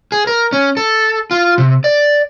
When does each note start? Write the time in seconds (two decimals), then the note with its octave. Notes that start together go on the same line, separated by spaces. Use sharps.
0.12 G#4
0.27 A#4
0.53 C#4
0.77 A4
1.31 F4
1.58 C3
1.84 D5